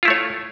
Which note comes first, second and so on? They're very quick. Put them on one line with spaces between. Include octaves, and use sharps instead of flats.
F4 E4 A3 C#5